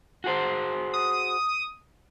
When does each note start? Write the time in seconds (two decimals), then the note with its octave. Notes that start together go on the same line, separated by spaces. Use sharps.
0.24 F#4 G#4 C5
0.94 D#6